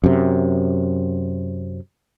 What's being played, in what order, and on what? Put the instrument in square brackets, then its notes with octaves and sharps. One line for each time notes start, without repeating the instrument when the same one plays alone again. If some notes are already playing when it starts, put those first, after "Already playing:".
[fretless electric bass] F#2 C3